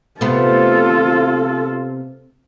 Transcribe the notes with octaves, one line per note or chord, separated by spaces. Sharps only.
C3 A3 B3 F4 A4